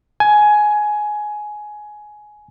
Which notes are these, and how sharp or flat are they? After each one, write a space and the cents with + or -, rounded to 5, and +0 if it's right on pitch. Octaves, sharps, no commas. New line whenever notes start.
G#5 +15